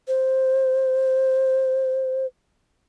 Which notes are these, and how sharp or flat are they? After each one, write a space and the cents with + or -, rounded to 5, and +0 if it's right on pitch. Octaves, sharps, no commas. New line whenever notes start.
C5 +5